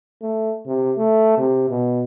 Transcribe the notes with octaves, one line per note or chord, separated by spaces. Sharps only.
A3
C3
A3
C3
B2